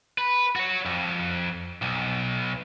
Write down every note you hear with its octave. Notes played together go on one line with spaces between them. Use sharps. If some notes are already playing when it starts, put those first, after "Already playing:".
B4
F#4 C#5
F2
B1